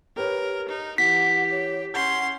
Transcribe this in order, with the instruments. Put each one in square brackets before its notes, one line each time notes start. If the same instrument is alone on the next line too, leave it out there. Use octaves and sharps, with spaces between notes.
[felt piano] G4 B4 C#5 [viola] A#4
[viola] D#4
[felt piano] E3 [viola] G4 [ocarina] F#5 [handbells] B6
[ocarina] C#5
[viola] C#4 C6 [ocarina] F#5 [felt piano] G6